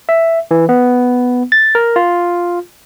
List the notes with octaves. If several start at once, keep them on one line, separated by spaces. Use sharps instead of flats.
E5
E3
B3
A6
A#4
F4